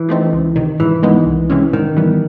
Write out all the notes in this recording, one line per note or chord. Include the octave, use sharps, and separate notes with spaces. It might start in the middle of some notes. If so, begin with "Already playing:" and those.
Already playing: E3
F3 A3 C4 D#4
C#2
C3 D#3
G#2 E3
D#3 G#3 B3 D#4
C2
C3 E3 G#3 C#4
G#2 D#3
E3 G3 B3